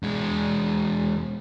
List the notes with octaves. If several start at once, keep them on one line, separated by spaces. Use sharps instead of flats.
E2 G#3